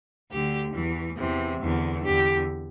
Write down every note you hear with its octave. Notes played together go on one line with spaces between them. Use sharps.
D2 D3 G4
E2 E3
E2 C3 E3
E2 D3
E2 D3 G4